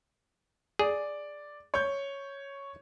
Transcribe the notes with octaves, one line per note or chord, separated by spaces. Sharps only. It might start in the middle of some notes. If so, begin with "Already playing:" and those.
G#4 D5
C#5 G6